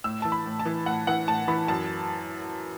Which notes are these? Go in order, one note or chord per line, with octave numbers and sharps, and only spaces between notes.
A2 E6
E3 A5
B5
A2
A5
E3
A2 F#5
E3 F#5
A2 A5
E3 B5
F#2 A5